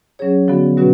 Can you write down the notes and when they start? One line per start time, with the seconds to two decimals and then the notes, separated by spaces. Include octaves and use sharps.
0.19 F#3 C#4 G#4 C#5
0.48 D3 F3 B3 F#4
0.77 B2 F#3 C#4 F#4 B4